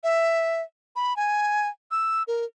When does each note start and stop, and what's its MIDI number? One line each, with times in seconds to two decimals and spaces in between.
0.04 0.62 76
0.96 1.16 83
1.17 1.69 80
1.91 2.23 88
2.27 2.45 70